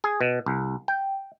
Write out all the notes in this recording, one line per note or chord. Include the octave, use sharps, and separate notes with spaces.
G#4
B2
C2
G5